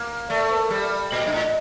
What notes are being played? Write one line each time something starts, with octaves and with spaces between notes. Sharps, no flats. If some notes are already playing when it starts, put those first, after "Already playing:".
Already playing: A#3
A3 D5
C5
A#4
G3
A#2 D#5
G2
A2